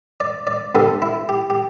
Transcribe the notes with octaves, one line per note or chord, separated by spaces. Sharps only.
D5
D5
D2 D3 G3 B3 A4
E4
G4
G4